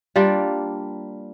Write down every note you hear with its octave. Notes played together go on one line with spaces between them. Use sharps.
G3 A#3 D4 F4